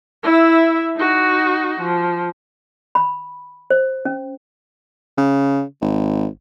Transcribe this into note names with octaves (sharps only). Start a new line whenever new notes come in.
E4 E5
D#4 F#4
F3
B5
C5
C#4
C#3
G#1